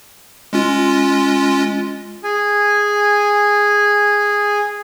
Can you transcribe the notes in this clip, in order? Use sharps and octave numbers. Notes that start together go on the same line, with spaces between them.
G#3 C#4 F4
G#4 G#5